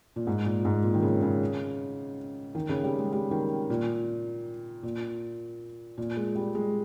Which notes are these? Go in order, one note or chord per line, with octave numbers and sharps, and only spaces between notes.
A#2
G#2
A#2
G#2
A#2
D#3
C#3
C#3
D#3
C#3
G3
G#3
G3
D#3
A#2
A#2
A#2
G#3
G3
G#3